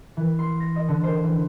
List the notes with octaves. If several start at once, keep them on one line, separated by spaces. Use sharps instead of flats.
E3
C6
A#6
D#5
D3
C5
E3